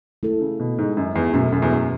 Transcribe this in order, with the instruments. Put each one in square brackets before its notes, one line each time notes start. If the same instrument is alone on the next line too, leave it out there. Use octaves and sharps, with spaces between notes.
[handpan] A3 E4 A4
[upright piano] C#3
B2
G#2
F#2
E2
[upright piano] F#2 [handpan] B2 A3 C#4 F#4
[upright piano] F#2
E2
F#2